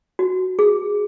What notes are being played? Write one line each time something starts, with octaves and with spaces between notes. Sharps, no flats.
F#4
G#4